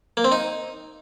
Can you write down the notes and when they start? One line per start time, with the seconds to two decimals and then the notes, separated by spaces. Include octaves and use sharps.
0.17 A#3
0.24 C4
0.32 D#4